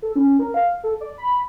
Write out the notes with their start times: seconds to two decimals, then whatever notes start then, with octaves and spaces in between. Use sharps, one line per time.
0.02 A4
0.16 C#4
0.39 A#4
0.54 F5
0.83 A4
1.01 D5
1.18 B5